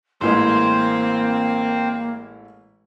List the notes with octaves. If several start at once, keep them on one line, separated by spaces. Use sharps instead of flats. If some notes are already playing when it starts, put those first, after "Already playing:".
A1 E3 G#3 A#3 C4 C5